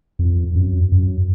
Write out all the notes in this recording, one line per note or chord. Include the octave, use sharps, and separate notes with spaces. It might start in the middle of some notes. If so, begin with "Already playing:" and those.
F2
F#2
F#2